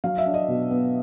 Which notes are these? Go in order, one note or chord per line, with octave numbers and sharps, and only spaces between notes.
F#3 F5
E5
D4
D#5
B2
B3